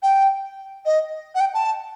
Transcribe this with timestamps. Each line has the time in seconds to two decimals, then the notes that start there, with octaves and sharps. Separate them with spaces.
0.02 G5
0.85 D#5
1.34 F#5
1.40 G5
1.54 A5